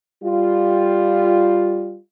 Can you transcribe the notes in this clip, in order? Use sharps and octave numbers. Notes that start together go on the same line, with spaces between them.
G3 F4